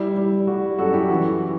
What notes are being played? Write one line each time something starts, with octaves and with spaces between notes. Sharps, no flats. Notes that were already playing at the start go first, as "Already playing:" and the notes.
Already playing: G3 E4
G3
G3 F#4
F#2 F#4 A4
E4 G4
E3 F#4